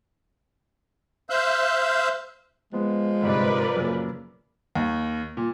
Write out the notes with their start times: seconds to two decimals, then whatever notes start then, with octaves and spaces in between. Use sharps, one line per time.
1.30 C5 E5 F5 E6 F#6 G6
2.73 F3 G#3 B3
3.23 G1 G#2 C3 A#4 B4 D5
3.76 F#2 A#2 C#3
4.75 D#2
5.37 A#2